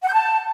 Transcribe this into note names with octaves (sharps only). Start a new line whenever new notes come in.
F#5
G6
A5